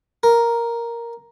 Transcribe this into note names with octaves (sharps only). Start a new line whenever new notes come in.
A#4